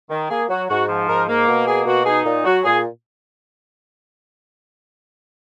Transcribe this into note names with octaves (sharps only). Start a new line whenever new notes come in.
D#3
A#3 G#4
F#3 F#4
G#2 F#4
F3
G#2 A#4
A#3
B2
A#3 G#4
B2 F#4
D#4 G#4
A#2
F#3 F#4
A#2 G#4